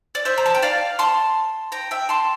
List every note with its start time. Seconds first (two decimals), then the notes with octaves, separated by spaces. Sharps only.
0.15 D5
0.25 C5 E5
0.38 A#5
0.46 A5
0.55 G5
0.62 D5 F5
0.99 A5 C6
1.72 G5 A#5
1.91 E5 G5
2.09 A5 C6